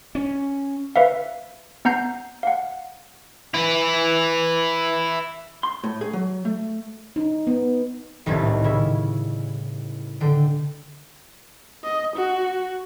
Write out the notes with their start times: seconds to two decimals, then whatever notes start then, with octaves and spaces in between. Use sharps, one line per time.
0.15 C#4
0.96 B4 E5 F5
1.85 B3 F#5 A#5 G6 C7
2.43 F5 F#5
3.54 E4 B4
5.63 C6
5.84 A2
6.01 G#4
6.13 F#3
6.45 A3
7.16 D#4
7.47 B3
8.26 D#1 C2 A2 G3 G#6 A6
8.64 C#3 E4
10.21 D3 G5
11.84 D#5
12.16 F#4